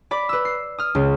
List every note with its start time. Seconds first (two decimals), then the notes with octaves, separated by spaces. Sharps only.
0.11 D5 B5 D6
0.29 B4 E6
0.45 C7
0.78 D#6 F6
0.95 C#2